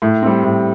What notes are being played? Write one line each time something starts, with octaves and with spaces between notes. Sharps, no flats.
A2
G3 C4
A2